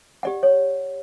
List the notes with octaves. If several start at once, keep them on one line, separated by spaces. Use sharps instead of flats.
G4 D5 F#5
C#5